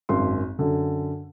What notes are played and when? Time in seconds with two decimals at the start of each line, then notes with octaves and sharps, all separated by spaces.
0.09 G#1 F#2 C6
0.59 F#2 D3